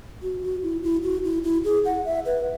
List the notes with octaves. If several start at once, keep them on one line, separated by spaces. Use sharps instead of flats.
F#4
F#4
E4
E4
F#4
E4
E4
G#4
F#5
E5
B4